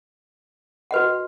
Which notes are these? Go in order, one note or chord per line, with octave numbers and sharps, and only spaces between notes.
F#4 B4 D#5 F#5